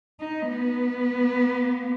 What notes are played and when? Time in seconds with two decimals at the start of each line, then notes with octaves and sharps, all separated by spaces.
0.21 D#4
0.49 B3